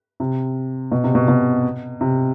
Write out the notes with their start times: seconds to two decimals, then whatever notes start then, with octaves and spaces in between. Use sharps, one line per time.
0.20 C3
0.92 B2
1.04 C3
1.15 B2
1.28 B2
2.01 C3